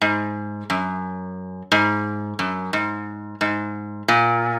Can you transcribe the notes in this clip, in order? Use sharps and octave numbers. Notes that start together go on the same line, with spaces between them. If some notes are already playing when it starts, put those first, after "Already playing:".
G#2
F#2
G#2
F#2
G#2
G#2
A#2